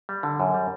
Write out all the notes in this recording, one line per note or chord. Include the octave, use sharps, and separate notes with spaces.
G3
D3
F#2
G3